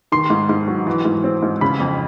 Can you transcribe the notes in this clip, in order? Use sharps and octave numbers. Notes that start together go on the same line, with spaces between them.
D#3 C6
G#2
G#2
F#3
E3
G#2
C4
G#2
C#3 B5
F2